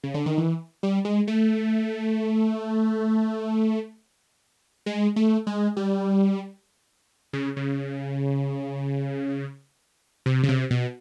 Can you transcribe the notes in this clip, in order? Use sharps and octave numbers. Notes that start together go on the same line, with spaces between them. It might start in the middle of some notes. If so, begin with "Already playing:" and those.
C#3
D3
D#3
E3
G3
G#3
A3
G#3
A3
G#3
G3
C#3
C#3
C3
C#3
C3
B2